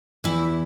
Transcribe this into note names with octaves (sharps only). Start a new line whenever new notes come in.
E2 E3 E4